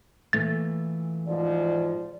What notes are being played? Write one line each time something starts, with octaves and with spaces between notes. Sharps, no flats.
A#2 E3 A3 A6
G#2 B2 F3 D5